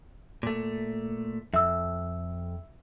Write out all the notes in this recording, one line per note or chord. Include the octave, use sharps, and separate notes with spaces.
A#2 A3
F2 E5 E6